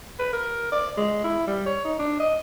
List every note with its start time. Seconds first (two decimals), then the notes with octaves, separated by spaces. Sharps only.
0.19 B4
0.33 A#4
0.72 D5
0.97 G#3
1.24 E4
1.47 G3
1.66 C#5
1.84 D#4
1.99 D4
2.20 D#5